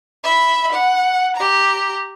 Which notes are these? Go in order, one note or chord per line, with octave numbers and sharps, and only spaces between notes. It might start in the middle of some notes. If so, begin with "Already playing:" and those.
E5 B5
F#5
G4 A#5